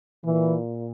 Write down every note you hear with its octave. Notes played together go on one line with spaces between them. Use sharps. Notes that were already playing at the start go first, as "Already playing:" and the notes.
A#2 E3